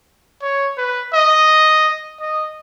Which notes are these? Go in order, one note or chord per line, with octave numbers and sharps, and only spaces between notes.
C#5
B4
D#5
D#5